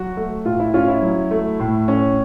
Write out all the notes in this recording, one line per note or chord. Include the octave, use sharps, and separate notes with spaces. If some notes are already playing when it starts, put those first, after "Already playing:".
Already playing: F#3 F#4
A3
A2 F4
E4
C#4 F4
E4
F#3
A3
A2
C#4